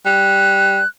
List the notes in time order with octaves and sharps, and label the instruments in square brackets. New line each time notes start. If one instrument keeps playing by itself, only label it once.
[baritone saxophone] G3 [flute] F#6